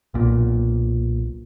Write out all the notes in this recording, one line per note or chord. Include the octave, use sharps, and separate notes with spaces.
B1 A#2